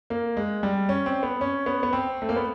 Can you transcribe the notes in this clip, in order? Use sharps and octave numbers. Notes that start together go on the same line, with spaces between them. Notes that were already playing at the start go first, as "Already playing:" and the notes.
A#3
G#3
G3
C#4
C4
B3
C#4
B3
B3
C4
A3
A#3
B3